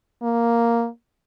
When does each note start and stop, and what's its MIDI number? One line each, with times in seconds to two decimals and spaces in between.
0.23 0.87 58